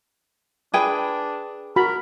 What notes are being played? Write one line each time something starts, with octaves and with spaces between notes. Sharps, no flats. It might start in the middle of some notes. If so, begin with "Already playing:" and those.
D4 G#4 B4 G5
F#4 A#4 B5